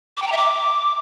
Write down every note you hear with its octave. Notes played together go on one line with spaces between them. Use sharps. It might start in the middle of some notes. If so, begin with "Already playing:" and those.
D6
G5
A#5
E5
D6